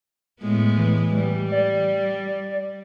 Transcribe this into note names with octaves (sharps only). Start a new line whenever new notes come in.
A2 G#3 B3
E3
G3
D5